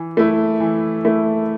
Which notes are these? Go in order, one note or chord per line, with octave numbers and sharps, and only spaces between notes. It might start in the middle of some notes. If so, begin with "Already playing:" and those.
Already playing: E3
A3 E4
E3
A3 E4